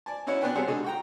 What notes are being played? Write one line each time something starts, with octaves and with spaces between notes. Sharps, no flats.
D5 G#5 A5
C#4 D#4 E4 F#4 C#5
B3 D4 F#4 B4 G5 G#5
G3 C4 F#4 G#4 A4 C#5
B2 D3 G#3 D#4 F#4 G#4
F#4 G5 A#5